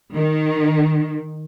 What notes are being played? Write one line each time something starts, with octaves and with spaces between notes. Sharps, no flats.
D#3